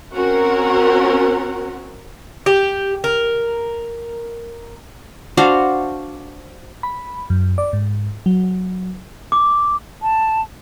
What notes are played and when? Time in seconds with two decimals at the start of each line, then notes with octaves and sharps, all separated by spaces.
0.14 C4 C#4 F#4 A#4 F#5
2.46 G4
3.04 A#4
5.37 D4 F#4 C5 F5
6.83 B5
7.30 F#2
7.58 D5
7.73 G#2
8.26 F#3
9.32 D6
10.02 A5